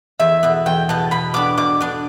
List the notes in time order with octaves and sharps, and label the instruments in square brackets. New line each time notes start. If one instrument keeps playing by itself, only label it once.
[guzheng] E2 [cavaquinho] E5
[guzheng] B2 B3
[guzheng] E2 [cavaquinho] G5
[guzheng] B2 B3 [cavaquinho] A5
[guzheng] B2 [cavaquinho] B5
[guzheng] B3 D4 [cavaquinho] D6
[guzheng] B2 [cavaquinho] D6
[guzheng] B3 D4